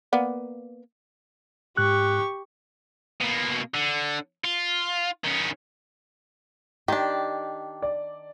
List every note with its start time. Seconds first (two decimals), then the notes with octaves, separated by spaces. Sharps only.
0.13 A#3 B3 D5
1.77 G#2 G4 C#6 F#6
3.21 B2 A#3
3.74 D3
4.44 F4
5.24 D#3 C#4
6.88 D#3 D4 G4
7.82 D5